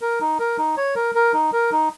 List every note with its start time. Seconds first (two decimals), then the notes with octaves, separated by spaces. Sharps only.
0.01 A#4
0.20 D#4
0.39 A#4
0.58 D#4
0.77 C#5
0.95 A#4
1.15 A#4
1.33 D#4
1.53 A#4
1.71 D#4